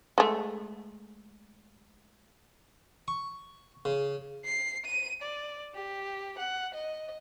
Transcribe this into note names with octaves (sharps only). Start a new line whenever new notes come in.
G#3 A3
C#6
C#3
C7
D#7
D5
G4
F#5
D#5